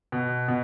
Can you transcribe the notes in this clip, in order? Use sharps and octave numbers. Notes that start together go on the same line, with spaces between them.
B2
B2